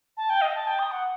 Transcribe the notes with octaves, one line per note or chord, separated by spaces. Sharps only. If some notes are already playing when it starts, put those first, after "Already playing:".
A5
G5
D#5
A5
G5
D#6
F#5